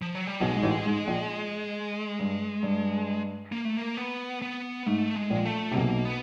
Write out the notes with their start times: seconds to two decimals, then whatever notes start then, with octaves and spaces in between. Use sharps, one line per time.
0.02 F3
0.15 F#3
0.27 G3
0.41 B1 B2 G#3
0.56 G#2
0.63 A1 A2
0.86 G#2
1.07 A#1 A#2
2.19 G2
2.63 G2
3.52 A#3
3.65 A3
3.77 A#3
3.97 B3
4.42 B3
4.86 G#2 A3
5.16 G#3
5.30 A#1 A#2
5.45 A3
5.71 C3
5.75 B1 B2 A#3
6.05 B3